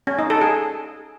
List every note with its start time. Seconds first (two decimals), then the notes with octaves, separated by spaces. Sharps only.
0.07 C#4
0.19 D#4
0.30 A4
0.42 G#4